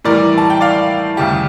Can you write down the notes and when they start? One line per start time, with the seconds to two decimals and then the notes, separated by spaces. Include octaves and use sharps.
0.04 A2 E3 G3 A#4 D5
0.38 A5
0.50 G5
0.61 D5 F5
1.17 D2 C#3 G3 G4